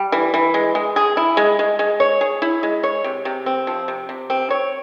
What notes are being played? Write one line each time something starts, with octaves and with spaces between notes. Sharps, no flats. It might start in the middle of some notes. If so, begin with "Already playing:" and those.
Already playing: G3
E3
E3
G#3
G#3
G#4
E4
G#3
G#3
G#3
C#5
G#4
E4
G#3
C#5
C3
C3
C4
F3
C3
C3
C4
C#5